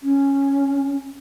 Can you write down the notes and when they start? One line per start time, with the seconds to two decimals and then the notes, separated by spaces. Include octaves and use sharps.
0.02 C#4